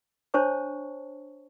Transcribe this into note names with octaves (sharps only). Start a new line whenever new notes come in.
D4 C5 C#5 A5 C#6